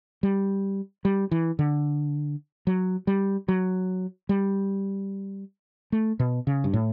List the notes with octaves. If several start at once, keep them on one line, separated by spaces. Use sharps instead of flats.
G3
G3
E3
D3
F#3
G3
F#3
G3
A3
B2
C#3
G2
A2